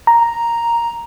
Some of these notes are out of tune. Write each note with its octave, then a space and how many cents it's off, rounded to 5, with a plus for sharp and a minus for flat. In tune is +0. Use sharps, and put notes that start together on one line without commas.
A#5 +0